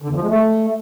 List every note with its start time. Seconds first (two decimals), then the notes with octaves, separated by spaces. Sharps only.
0.02 D3
0.09 E2
0.16 F3
0.23 G#3
0.30 A3